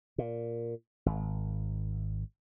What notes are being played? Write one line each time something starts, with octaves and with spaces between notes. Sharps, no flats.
A#2
G#1